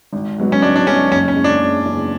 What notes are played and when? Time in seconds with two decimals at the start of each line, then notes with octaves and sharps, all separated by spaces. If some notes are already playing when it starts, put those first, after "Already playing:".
0.13 G#1
0.38 G#2 F#3 B3
0.52 C#4
0.62 G#1 D4
0.76 D4
0.87 G#2 F#3 B3 C#4
1.11 F#1 C#4
1.28 C#4
1.36 E2 C#3
1.44 D4
1.60 F#1
1.86 E2 C#3